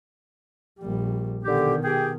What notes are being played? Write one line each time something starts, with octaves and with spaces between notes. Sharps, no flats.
A#1 G3
B2 D3 D#3 G4
G4 G#4 G5